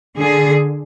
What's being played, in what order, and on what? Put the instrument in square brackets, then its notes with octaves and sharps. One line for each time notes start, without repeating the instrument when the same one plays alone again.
[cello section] D3 G#4